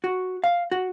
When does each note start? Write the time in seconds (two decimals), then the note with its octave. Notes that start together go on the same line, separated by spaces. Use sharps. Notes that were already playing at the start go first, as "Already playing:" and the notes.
0.04 F#4
0.44 F5
0.72 F#4